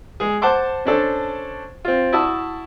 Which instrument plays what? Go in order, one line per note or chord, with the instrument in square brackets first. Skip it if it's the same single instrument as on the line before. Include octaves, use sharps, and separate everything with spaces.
[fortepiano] G#3 G#4
C5 F#5 A5 C6 D6
C#4 D4 A4 C5
C4 F4
E4 F#4 E5 A5 D#6 E6